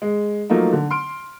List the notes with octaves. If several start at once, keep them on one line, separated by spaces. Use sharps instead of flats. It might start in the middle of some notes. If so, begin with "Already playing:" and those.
G#3
F3 F#3 A3 A#3 D#4
D3
C6 F6 D7